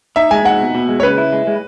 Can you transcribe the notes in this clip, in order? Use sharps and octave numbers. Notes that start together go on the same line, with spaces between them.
D#4 E5
G#3 G#5
D#4 F#5
B2
B2
G#3
C#5
C#3 B4
E4
G#3
G#3